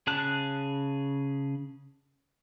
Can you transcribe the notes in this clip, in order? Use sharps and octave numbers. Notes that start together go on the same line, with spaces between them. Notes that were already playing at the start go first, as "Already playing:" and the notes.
C#3 G#4 A5 F#6